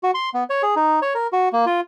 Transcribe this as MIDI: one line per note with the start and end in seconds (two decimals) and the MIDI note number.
0.03 0.11 66
0.14 0.29 84
0.34 0.44 59
0.50 0.62 73
0.63 0.75 68
0.76 1.00 63
1.02 1.14 73
1.15 1.27 70
1.33 1.49 66
1.53 1.65 58
1.66 1.80 65